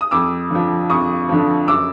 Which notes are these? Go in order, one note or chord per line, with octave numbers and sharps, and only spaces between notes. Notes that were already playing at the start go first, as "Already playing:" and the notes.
D#6
F2 D6 E6
D3 F3
F2 C#6 D#6
D3 F3
F#2 D6 E6